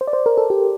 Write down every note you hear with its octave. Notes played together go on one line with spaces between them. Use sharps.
C5
D5
C5
A#4
A4
G4